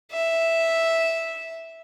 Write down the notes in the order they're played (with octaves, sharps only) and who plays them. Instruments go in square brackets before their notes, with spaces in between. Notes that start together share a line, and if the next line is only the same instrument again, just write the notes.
[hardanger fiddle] E5